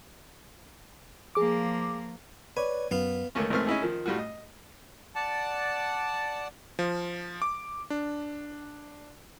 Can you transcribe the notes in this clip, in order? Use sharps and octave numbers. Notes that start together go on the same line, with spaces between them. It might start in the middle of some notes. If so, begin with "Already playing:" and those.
F3 A#3 G#4 D6
B4 C#5 D5 G#5
F#2 B3 F5
C#2 D#3 A3 C#4
G#1 D#3 E3 A3 C4 F6
C#4 D#4 E4 G#4
D#3 F3
A2 G3 F4 F#4
D#5
D5 F#5 A5
F3
D6
D4